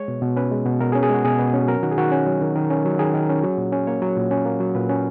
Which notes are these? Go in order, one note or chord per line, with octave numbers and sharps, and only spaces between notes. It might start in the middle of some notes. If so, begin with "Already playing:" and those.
Already playing: G#3 C#5
B2
B2
C#4 B4
G#3
B2
B2 A#4
G#4
C#4
G#4
G#3 F#4
B2 G#4
B2
C#4
F#3 A#4
D#3 F#4
G#4
D#3 F#4
C#4
F#3
D#3
D#3
C#4
F#3
D#3 G#4
D#3
C#4
F#3
A#2
C#4
A#3 C#5
F#3
A#2
C#4
A#3
F#3
A#2 B4
C#4